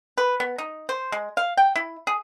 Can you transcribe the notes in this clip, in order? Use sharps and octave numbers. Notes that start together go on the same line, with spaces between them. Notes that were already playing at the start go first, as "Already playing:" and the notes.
B4
B3
D#4
C5
G#3
F5
G5
E4
G#4